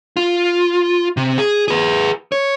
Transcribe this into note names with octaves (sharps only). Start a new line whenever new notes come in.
F4
C3
G#4
G#4 B4
C#5